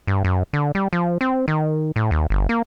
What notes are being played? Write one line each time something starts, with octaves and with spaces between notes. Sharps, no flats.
G2
F#2
D3
G3
F3
C4
D#3
A2
D#2
G1
A#3